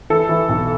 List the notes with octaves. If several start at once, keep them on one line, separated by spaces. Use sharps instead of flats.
E3 A4
E3
B1